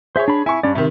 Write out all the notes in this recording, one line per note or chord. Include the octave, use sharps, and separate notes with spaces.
G#4 C5 C#5 E5
D4 B5
E4 G#5 C#6
G2 C#4 D5
C3 D#3 E5